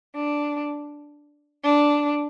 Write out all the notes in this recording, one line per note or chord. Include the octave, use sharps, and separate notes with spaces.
D4
D4